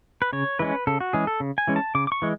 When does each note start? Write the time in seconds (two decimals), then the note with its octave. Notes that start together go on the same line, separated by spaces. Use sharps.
0.22 B4
0.33 C#3 C#5
0.59 E3 G#3 C#4 B4
0.87 C#3 A4
1.01 F#4
1.13 E3 G#3 C#4 G#4
1.27 A4
1.40 C#3
1.58 G#5
1.67 E3 G#3 C#4
1.76 A5
1.95 C#3 D6
2.07 D6
2.12 C#6
2.22 E3 G#3